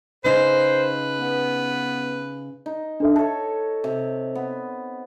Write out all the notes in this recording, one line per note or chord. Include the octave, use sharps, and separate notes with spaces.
C#3 D#4 B4 C5
B3
D#4
D4 A4 E5
A4 C#5 A5
C3
B3